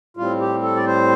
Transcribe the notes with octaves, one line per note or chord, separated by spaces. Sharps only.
A2 G3 C4 F4
G4
A4
D5
C5